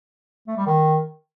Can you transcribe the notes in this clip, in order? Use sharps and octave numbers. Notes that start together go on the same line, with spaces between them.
A3
G3
D#3